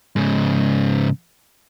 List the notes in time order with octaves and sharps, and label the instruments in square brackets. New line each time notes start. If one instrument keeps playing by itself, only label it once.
[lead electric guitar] G#2 C#3